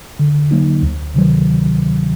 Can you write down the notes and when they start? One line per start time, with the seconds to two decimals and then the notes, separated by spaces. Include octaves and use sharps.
0.19 D3
0.51 F#3 A#3 D#4
0.82 D2
1.14 C3 D#3 F#3